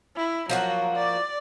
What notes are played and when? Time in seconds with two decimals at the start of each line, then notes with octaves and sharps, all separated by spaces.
0.16 E4
0.49 F3 F#3 A#3 F#4
0.95 D5